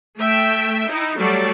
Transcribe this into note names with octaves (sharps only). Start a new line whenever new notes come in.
A3 E5 G5
D#4 E4
F#3 G3 A3 A4 D5